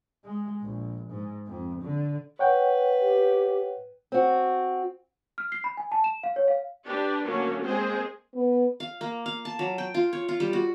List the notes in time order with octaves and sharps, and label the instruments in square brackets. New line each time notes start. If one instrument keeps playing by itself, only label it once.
[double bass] G#3
A#1
G#2
F2
D3
[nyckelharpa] B4 [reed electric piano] C#5 F#5 G5
[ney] G4
[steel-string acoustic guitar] C4 F#4
[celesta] F6
C7
B5
G#5
A5
E7
F5
C#5
F5
[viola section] D4 G4 B4
D3 F#3 A3 A#3 C#4
G#3 A#3 C4 G#4 C5
[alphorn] B3
[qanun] F5
A#3
F5
A5
F#3
G5
F4
C#5
F4
G3
F#4